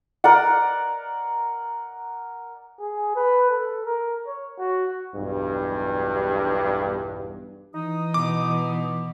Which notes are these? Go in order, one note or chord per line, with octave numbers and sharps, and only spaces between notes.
A#4 D5 F#5
G#4
B4
A4
A#4
C#5
F#4
B1 E2 G2
E3 D#4 D#6
B2 D6